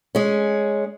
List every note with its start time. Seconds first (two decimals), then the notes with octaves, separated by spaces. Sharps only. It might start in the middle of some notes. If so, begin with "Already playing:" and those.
0.15 G#3 C#4